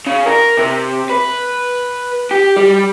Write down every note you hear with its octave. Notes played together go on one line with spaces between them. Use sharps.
C#3
A#4
C3
B4
G4
G3